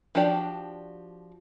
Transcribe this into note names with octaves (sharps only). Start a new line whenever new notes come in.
F3 D4 F#4 G4 D5